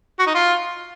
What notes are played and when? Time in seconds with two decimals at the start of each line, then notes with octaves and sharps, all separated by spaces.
0.19 F#4
0.27 D#4
0.35 F4